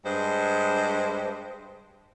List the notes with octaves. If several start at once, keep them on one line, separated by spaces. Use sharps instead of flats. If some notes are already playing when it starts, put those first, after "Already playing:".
G2 G#3 C5